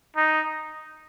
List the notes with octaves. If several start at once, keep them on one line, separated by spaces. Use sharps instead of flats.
D#4